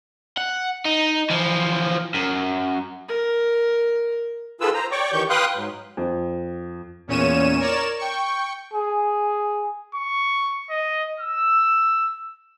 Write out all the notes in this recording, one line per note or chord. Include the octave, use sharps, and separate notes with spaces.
F#5
D#4
E3 F3
F#2
A#4
D#3 F4 G#4 A4 B4 E6
C5 A#5
C#5 D5 G5 C#6 D6
D#3 E3 G4 C#6 G6
B4 F5 G5 C6 D#6 F#6
G#2 F#3
F2
E2 A#2 C#4 C#5 D#7 E7
A#4 C#5 D5 E7
G5 C#6
G#4
C#6
D#5
E6